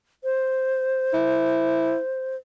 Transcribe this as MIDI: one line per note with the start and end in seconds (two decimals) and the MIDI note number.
0.24 2.36 72
1.14 1.98 64